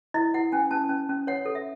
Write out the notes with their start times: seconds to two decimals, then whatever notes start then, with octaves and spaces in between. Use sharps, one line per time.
0.14 E4 D#5
0.34 E4 F#5
0.52 C#4 G#5
0.71 C#4 A5
0.89 C#4
1.09 C#4
1.27 C#5 F#5
1.46 A4
1.55 E5